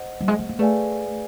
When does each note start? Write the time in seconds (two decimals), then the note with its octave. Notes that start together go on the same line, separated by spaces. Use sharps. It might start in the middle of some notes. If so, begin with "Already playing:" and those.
Already playing: C5 D#5 F#5
0.21 G3
0.28 G#3
0.39 A3
0.49 A#3
0.59 A3 G#4 B4 D5 F5 G#5